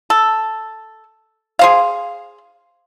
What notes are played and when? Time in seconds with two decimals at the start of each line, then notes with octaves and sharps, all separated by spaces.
0.10 A4
1.59 G#4 C5 F5